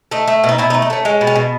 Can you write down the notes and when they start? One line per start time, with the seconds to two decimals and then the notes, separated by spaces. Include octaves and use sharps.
0.11 A3 D#4
0.28 A3
0.44 B2
0.49 D#4
0.58 B2 E4
0.70 D#4
0.74 A3
0.82 D#4
0.90 A3 C#4
1.05 G#3 C#4
1.21 B2
1.27 C#4
1.35 B2